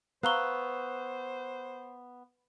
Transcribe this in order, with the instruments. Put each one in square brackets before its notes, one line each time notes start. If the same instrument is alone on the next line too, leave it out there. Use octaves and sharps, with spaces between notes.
[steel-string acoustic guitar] B3 [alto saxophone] C5 [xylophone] F5 A#5 G7 [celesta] C#6 E6 F#6